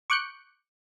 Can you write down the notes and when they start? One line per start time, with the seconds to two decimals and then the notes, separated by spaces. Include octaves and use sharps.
0.10 C#6 D6 F#6 G6 C#7